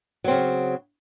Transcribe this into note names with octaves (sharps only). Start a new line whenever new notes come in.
C#3 F#3 C4